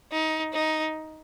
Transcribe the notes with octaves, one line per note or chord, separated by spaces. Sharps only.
D#4
D#4